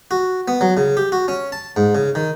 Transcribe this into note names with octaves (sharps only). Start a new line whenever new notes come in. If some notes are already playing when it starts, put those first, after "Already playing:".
F#4
B3
F#3
C#3
G4
F#4
C#4
A5
G#2
C#3
D#3